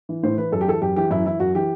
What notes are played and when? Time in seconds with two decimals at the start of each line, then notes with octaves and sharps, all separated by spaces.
0.09 E3
0.23 A2 C5
0.38 E3 B4
0.52 F#2 A4
0.61 G4
0.67 E3 A4
0.82 F#2 G4
0.96 E3 G4
1.11 F#2 E4
1.26 E3 E4
1.40 F#2 F#4
1.55 E3 G4